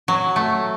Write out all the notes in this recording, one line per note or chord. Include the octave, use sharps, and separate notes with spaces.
F#3
A3